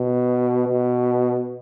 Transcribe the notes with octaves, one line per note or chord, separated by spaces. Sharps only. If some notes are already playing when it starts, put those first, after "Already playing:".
Already playing: B2
B2